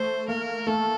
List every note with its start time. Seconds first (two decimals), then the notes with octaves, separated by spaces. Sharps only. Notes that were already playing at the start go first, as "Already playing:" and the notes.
Already playing: A3 C5
0.28 A#3 A#4
0.67 A3 A4